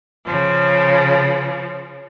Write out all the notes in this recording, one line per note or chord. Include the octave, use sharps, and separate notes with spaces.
C#3 F3